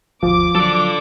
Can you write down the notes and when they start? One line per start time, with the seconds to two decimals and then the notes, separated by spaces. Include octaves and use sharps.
0.23 G1 D#2 F3 D6
0.55 F#3 A4 D5 E6